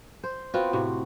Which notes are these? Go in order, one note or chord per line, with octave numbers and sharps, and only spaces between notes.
C5
B3 C4 F4 F#4
A2 C3 F#4